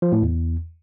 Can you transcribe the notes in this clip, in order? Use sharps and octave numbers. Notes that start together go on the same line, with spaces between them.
F3
A2
E2